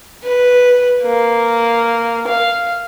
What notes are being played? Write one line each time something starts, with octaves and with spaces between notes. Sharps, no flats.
B4
A#3
F5